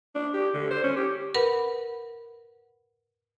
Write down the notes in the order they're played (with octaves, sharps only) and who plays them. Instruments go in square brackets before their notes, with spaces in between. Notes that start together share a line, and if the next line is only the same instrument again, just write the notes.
[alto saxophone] D4
G4
D3
C5
C#4
G4
[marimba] A#4 B4 F#5 B5